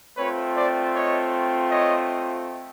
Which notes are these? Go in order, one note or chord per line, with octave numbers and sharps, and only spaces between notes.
A3 C4 F4 B4 C#5
C5 D5
C#5 D#5
C#5 D#5